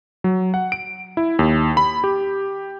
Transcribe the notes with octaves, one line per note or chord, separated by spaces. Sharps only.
F#3
F#5
D7
E4
D#2
B5
G4